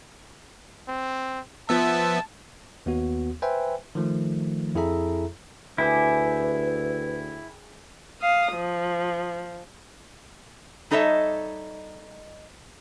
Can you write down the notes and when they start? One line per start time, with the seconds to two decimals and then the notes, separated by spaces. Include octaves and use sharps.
0.88 C4
1.69 F3 B3 E5 A5
2.86 D#2 B3 F#4
3.42 B4 C5 E5 G5 G#5
3.95 D#3 F3 A3
4.75 F2 E4 G#4 A4 E5 A#5
5.78 D2 E4 G#4 B4 G5 D6
8.20 F5 D#6
8.53 F3
10.91 G3 D#4 A4 C#5 D#5 E5